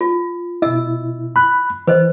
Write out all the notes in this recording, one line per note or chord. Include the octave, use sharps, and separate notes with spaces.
F4
B2 E4 D#5 E6
B5 F#6
E3 B4 C5 D#5